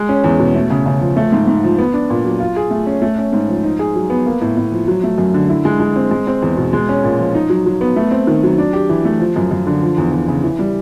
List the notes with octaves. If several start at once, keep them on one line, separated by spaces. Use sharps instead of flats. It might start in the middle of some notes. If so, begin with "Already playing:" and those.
Already playing: G#3
C#4
E2
B2
A3
C#3
C#3
F3
A3
G#2
G#2
F3
B3
D4
A#2
F#3
F4
G#4
A3
C#4
A3
C#4
G#2
F3
D#4
G#4
F#3
B3
A#3
A2
A2
F3
F#3
A3
F#2
D3
E4
G#3
G#3
C4
G#3
C4
E2
B2
G#3
C#4
A#2
F3
D#4
F#3
F#3
B3
A3
C4
D#3
F#3
D4
G4
E3
A3
F3
F#2
F#2
D3
F3
E2
E2
C#3
E3
G3